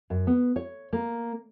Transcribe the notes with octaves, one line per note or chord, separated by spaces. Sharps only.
F#2
B3
C#5
A#3